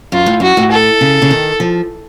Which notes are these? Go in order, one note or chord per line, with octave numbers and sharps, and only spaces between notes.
F#2 F4
A2
F#2 F#4
A2
A4
C#3
C#3
D#3
F3